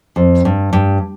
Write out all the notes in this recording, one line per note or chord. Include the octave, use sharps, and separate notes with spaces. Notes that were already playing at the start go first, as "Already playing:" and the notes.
F2
G2
G2